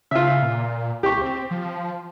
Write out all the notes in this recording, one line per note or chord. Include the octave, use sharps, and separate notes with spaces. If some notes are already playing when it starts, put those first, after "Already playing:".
C#3 F4 E5
A#2
C#2 G4 C#6
C4
F3